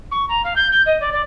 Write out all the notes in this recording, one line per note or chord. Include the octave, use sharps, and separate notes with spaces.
C#6
A#5
F5
G6
G6
D#5
D5
D5